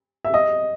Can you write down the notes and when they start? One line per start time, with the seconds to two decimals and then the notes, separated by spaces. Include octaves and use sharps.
0.25 E5
0.34 D#5